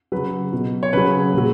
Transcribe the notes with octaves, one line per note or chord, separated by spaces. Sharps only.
C#3 F#3 B4
B2 F#3
C#5
C#3 F#3 B4
A#2 F#3